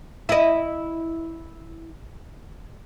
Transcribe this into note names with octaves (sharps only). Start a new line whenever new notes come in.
E4 D#5